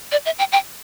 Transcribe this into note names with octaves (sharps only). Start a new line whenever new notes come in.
D5
E5
G5
G5